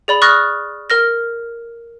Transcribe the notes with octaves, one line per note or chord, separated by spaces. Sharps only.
G#4 D5 B5
C#6 D#6 F6 F#6 A6 A#6
A#4 F6 A#6